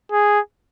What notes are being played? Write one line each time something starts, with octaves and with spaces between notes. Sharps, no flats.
G#4